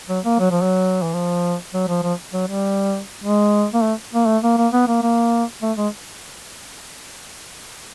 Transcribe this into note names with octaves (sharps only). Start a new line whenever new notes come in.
F#3
A#3
F#3
F3
F#3
E3
F3
F#3
F3
F3
F#3
G3
G#3
A#3
A3
A#3
A3
A#3
A#3
B3
A#3
A#3
A3
G#3